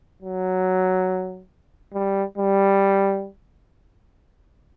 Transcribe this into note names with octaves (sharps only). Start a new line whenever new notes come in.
F#3
G3
G3